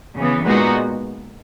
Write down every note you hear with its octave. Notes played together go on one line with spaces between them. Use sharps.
C#3 E3 B3
A#2 G#3 B3 D#4 F#4